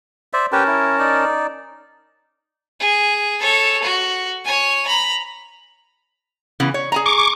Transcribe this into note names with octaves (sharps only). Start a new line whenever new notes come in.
C5 D5 E5
C#4 G4 A#4 B4 G5 A5
E4
D#4 D5
G#4
A4 C#5
F#4
C#5 G#5
A#5 B5
C#3 E3 B3
C#5
G#4 G#5 A#5
C#6 D6